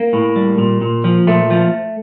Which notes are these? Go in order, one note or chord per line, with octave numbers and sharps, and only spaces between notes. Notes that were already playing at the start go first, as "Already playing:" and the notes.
Already playing: A#3
A2
G3
A#2
A#2
F3
A#2 A3
F3